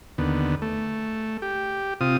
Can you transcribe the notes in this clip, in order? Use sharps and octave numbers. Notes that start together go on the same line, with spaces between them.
D#2 D3 B3
A3
G4
C3 F4 D#6